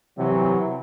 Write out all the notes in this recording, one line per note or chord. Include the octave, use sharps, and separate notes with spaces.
C3 E3 F#3